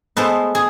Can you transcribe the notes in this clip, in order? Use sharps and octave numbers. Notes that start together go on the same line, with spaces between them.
G#3 B3 A4 C5
G#4